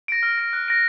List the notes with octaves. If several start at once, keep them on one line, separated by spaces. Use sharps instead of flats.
A#6 D7
F6
A#6 D7
F#6
A#6 D7